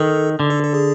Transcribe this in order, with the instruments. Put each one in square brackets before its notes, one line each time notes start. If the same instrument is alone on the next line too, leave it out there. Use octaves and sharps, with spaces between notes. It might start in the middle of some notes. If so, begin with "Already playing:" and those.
Already playing: [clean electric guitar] D#3 [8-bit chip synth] A4
[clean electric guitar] D3
[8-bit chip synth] A4
A4
G#4